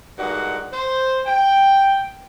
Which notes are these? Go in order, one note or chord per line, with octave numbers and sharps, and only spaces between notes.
G2 A#2 G#3 D#4 F#4 F#5
C5
G5